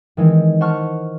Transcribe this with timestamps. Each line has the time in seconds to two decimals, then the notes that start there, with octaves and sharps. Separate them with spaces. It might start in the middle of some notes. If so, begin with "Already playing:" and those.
0.17 D#3 E3 G#3 C4
0.61 C5 F#5 A5 C#6 F6